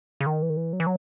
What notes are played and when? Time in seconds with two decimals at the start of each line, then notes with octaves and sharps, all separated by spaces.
0.20 C#3
0.26 D#3
0.42 E3
0.50 D#3
0.57 E3
0.73 F#3
0.80 E3
0.87 F#3